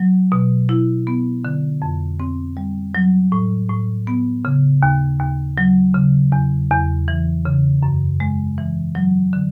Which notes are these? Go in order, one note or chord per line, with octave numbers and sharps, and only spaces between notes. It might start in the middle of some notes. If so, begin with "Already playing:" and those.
Already playing: F#3
B2
E4
B3
D3
F2
C4
G3
F#3
A2
A2
B3
C#3
D#2
D#2
F#3
C#3
E2
E2
E3
C#3
F#2
G#3
E3
F#3
D3